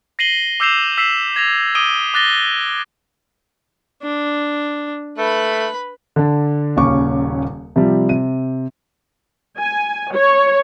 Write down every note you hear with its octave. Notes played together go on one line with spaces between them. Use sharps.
A#6 C7 D#7 F#7 G7
D6 E6 G6 C7 E7 F7
E6 B6 C7 E7 F#7
G#6 A#6 F7
D6 D#6 D7 D#7 G7
D6 F#6 A6 A#6 G7
D4
A3 B4 B5
D3 D4
D#1 D#2 C#3 C#4 C#6 D6
C3 F3 G3
C3 D#7
G#5
C#5